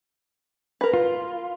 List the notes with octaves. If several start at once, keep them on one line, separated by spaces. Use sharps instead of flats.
A#4 B4
F4